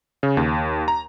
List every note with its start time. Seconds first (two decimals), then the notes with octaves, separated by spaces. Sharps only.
0.23 C#3
0.37 D#2
0.88 A#5